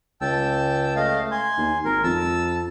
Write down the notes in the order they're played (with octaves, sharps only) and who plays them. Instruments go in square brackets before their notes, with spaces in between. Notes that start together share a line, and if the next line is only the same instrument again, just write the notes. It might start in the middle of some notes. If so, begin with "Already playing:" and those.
[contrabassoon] C#2 [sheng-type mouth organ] G5 A5 E6
[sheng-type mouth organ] A3 D#5 F5
G#5 C6
[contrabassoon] D#2
[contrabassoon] G#1 [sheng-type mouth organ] A#4
[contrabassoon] F2 [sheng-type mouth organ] A5 E6